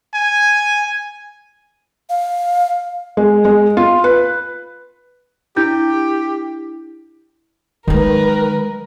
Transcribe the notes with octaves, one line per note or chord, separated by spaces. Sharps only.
G#5
F5
G#3
G#3
F4
B4
D4 E4 G4 G6
D#3 F#3 G#3 A#4 B4